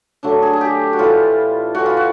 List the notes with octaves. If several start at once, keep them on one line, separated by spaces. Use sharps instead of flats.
D3 F#3 A3 D4
G#4
G#4
G4
F#4
A2 E3 G3 F4
A2 E3 G3 F#4
F4
F#4